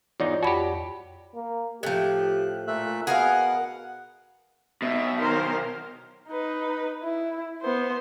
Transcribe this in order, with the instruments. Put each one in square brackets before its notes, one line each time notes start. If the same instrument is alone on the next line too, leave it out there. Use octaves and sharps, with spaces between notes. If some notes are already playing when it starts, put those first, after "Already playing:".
[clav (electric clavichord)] E2 G#2 D#4 [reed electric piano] F4 C#5 D5
[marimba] F2 B5 [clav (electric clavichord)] F#4 G4
[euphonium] A#3
[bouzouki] A2 F3 [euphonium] G4 [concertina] F#6
[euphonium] A#2 [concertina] A3 E5 F#6
[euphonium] B2 [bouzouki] G#4 A#4 F5 [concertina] F#5
[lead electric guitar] B1 B2 [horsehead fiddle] E5
[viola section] D#3 [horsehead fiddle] A#4 C5
[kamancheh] D#4 B4
E4
B3 C5